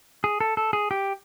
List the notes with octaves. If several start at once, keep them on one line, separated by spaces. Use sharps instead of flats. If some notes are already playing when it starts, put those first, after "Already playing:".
G#4
A4
A4
G#4
G4